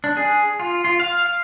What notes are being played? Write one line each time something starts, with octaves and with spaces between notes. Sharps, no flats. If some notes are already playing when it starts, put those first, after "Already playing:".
D4
G#4
F4
F4
F5
F5